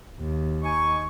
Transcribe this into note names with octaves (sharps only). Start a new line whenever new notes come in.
D#2
D#4 G#5 C#6